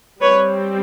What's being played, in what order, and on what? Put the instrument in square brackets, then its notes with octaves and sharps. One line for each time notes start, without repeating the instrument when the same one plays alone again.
[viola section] G3 C4 B4 C#5